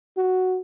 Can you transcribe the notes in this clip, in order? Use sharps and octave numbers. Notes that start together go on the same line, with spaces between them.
F#4